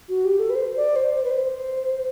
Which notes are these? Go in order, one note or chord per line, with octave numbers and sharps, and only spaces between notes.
F#4
G4
A4
B4
C5
D5
C5
C5
B4
C5